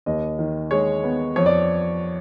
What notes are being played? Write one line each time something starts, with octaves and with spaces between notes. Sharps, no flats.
D#2 D#5
D#3
G#3 C#5
B3
F2 C#5
D5